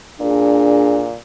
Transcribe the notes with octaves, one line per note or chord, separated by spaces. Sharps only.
A#2 D4 G#4